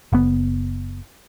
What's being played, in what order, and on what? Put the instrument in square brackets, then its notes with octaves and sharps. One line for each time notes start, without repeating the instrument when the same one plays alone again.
[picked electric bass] F#1 B3